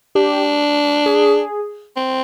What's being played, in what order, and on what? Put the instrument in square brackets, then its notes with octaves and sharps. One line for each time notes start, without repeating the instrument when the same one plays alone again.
[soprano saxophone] D4 [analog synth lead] G4
[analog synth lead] G#4
[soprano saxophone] C4